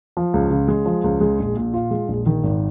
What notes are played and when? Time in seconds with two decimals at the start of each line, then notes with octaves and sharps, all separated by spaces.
0.17 F3
0.34 C#2
0.51 C#3
0.68 G#3
0.86 F3
1.04 C#2
1.21 G#3
1.39 A#1
1.56 A#2
1.74 F4
1.91 G#3
2.08 A#1
2.26 D#3
2.44 G#1